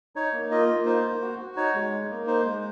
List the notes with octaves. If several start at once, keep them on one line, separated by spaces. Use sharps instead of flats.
D#4 C#5
A#3
F4 D#5
A#3
D#4 C5
A#3
F#4
F#4
D#4 C#5
G#3
D#4
A#3
D#4 C5
G#3